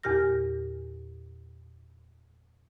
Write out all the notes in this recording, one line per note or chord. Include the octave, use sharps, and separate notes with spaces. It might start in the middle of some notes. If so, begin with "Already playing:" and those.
E2 A#2 G4 F6 A#6